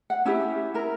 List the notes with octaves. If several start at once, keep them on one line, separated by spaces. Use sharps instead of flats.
F#5
C#4 E4 G4 E5
E4 A#4